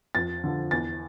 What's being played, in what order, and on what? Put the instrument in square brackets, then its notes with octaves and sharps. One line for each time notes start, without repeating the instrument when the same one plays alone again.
[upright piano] F2 A6
D3 F3
E2 A6